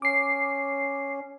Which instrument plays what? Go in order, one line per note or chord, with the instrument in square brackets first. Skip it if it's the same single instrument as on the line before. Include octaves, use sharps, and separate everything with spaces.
[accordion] C#4 [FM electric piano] D6 C7